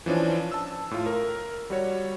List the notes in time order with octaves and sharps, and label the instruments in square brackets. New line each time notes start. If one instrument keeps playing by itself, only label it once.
[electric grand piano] E3 F3 C#4 D4
A5 E6
A2 F4
A#4
G3 F#4 C#5